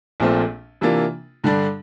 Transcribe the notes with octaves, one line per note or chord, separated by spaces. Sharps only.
A#1 A#2 A3 C4 F4
C3 E3 A#3 D4 F4
G2 D3 G3 D4